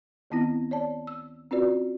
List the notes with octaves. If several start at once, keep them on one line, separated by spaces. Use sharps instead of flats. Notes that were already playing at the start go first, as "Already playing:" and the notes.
D2 D#3 B3 C4 E4 A#6
C#5 D5 A5
E6
C4 C#4 F4 F#4 B4 D5